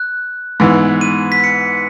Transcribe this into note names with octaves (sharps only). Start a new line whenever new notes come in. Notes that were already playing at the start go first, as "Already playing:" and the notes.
Already playing: F#6
G#2 E3 B3
D#7
B6
C#7